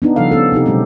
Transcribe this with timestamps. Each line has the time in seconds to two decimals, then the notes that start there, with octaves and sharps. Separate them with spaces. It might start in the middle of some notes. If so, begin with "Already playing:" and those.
0.02 B3 D4 D#4
0.16 C#3 F3 G3 A4 F5
0.32 B3 C#4 A4
0.52 C3 C4 D#4 G4
0.66 B2 D3 F#3 G#3 C4 G4